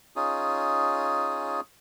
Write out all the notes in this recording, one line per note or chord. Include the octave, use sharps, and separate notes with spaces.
C#4 D#4 F4 G#4